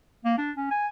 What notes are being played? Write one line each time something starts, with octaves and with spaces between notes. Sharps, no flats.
A#3
D4
C#4
G#5